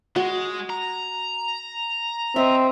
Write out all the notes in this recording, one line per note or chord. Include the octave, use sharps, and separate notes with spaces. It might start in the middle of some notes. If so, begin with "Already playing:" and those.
G#3 F#4
A#5
C4 D#5 E5